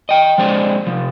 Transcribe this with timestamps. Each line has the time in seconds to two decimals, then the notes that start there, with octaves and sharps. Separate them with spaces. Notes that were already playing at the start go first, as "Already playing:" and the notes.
0.09 D#5 G5
0.38 F3 G#3 C4 D4 G#4
0.87 C3 F3